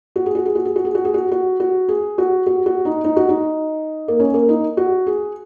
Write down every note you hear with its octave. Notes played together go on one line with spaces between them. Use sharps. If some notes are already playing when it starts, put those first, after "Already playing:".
F#4
G#4
F#4
G#4
F#4
G#4
F#4
G#4
F#4
G#4
F#4
F#4
F#4
G#4
F#4
F#4
F#4
D#4
D#4
F#4
D#4
A#3
C#4
A#3
D#4
F#4
G#4